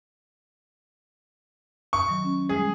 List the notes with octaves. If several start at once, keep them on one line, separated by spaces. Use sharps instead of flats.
C#6
D#3 F#3
C#4
G3 G#3 G#4